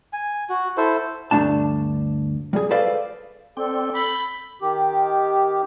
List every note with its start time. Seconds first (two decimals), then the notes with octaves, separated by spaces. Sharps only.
0.13 G#5
0.49 F#4
0.77 E4 A4 C5
1.31 D2 G2 E3 A3 D4 A5
2.53 G3 G#4
2.70 A4 B4 C5 D5 F5
3.57 C4 A4 D5 G5
3.95 B5 G6 A6
4.62 D#3 G4